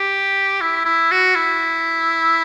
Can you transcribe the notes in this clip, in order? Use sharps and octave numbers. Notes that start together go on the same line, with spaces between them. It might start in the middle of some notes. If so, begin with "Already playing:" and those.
Already playing: G4
E4
E4
F#4
E4